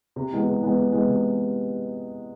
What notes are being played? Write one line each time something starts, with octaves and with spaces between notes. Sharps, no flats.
C3
E3 G#3 B3
C3
E3 G#3 B3
C3
E3 G#3 B3
C3